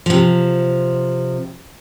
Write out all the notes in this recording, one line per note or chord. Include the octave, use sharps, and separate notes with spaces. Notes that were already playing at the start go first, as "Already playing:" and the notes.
C3 F3